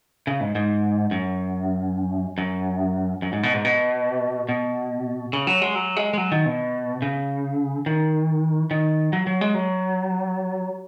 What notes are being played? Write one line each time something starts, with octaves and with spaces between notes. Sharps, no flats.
C#3
G#2
G#2
F#2
F#2
F#2
G#2
B2
G#2
B2
B2
C#3
F#3
G#3
F#3
G#3
G#3
F#3
D#3
B2
C#3
D#3
D#3
F#3
F#3
G#3
F#3